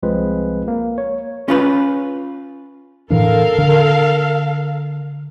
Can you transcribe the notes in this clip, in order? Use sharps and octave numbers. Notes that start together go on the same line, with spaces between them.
C2 F3 G#3 C4 B4
A#3
C#5
C#4 F4 B4
A2 E3 D4 A4 A#4 F5
D3